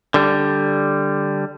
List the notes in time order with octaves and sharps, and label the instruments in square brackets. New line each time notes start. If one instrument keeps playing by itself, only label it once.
[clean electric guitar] D3 G3